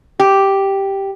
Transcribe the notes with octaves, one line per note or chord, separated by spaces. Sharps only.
G4